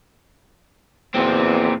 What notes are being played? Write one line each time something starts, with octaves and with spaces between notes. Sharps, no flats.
E2 A#2 C4